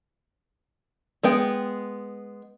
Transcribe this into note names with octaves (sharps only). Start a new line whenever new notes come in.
G#3 B3 G5